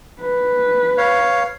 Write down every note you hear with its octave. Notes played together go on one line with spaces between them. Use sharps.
B4
C#5 F5